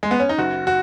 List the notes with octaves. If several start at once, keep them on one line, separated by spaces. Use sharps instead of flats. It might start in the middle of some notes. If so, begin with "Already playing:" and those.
G#3
B3
C#4
D#4
F#1 F#4
F#4